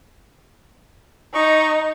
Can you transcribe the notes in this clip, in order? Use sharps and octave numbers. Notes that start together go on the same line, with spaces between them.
D#4 D#5 C#6